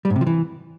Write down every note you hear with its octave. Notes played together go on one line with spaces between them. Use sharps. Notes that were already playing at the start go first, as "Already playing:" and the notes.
G3
G#2
C3
F3
E3